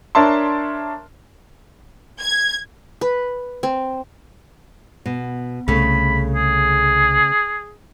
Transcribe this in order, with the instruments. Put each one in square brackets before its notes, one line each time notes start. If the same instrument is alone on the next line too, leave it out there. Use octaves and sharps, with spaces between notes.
[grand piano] D4 A#4 C#5 E5 A5 C6
[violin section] G#6
[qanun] B4
C4
[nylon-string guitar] B2
[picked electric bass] C2 [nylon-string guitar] C#3 A3 [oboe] B5
[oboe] G#4